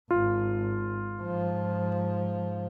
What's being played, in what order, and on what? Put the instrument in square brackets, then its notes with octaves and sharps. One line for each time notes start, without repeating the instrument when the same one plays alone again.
[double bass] G#1 [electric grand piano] F4
[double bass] G#2 F3